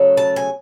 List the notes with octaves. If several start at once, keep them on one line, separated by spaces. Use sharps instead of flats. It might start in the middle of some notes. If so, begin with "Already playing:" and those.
Already playing: C#3 F#3 A3
A5
G#5